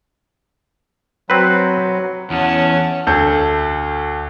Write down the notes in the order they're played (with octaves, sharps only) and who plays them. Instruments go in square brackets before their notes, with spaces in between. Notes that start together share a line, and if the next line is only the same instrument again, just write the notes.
[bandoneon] F#3 [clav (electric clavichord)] C4 B4
[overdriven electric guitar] E2 [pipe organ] C#4 [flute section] C#5 [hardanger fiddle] F#5 A5
[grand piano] D2 A4 G6